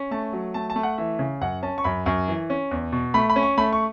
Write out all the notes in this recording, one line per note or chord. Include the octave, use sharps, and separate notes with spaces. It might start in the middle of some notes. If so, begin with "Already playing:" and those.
Already playing: C#4
A3 A5
F#3
A3 A5
A5
A3
F#5
E3 E5
C#3
F#2 F#5
C#4 A5
C#6
F#2 B5
F#2 C#6
E3
C#4
E2
B2
A3 B5
B5
C#4
C#6
A3 B5
C#6